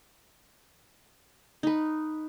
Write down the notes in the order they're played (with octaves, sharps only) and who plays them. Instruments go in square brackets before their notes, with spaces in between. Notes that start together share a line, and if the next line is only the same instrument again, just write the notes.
[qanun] D#4 B4